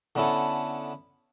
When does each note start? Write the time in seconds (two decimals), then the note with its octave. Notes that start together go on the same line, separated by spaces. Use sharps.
0.16 D3 B3 C#4 E4 A4